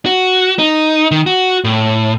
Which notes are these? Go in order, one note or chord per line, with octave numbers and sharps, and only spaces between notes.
F#4
D#4
D#3
F#4
A2